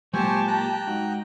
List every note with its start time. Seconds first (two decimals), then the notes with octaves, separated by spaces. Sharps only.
0.14 A#2 F#3 G#3 G4 C5 G#5 A5 C#6
0.47 G5 A#5 F#6
0.87 G#2 D#4 F#4